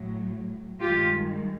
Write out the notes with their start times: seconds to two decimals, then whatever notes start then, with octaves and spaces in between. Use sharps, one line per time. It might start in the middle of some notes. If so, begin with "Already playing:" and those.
Already playing: A2 F#3
0.81 G2 D#3 G#3 F4 G4